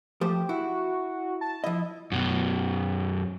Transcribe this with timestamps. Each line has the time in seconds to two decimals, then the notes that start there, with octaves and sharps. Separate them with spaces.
0.21 F3 A3 G4 C5
0.49 E4 F#4
1.41 A5
1.64 F3 E4 D#5
2.12 F#2 B2